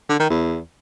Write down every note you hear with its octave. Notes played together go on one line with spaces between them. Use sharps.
D3
D#3
E2